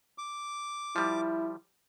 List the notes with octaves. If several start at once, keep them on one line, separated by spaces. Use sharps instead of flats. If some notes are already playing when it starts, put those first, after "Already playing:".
D6
F3 G3 E4